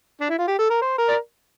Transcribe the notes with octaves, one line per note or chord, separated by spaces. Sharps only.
D4
E4
F4
G4
A4
A#4
C5
A#4
D5